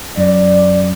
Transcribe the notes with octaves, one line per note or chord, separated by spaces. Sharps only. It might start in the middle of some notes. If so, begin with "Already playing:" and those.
F#2 D5